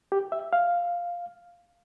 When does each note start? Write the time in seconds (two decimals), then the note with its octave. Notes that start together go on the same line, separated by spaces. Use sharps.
0.12 G4
0.32 E5
0.53 F5